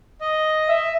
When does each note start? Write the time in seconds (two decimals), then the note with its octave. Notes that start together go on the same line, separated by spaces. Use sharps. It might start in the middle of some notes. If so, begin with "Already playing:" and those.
0.21 D#5
0.68 E5